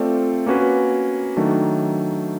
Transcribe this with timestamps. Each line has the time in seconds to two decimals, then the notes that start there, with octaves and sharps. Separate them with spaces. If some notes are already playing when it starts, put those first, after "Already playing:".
Already playing: A3 C4 F4 A4 D5
0.47 A#3 C#4 F#4 B4
1.37 D#3 F#3 A3 D4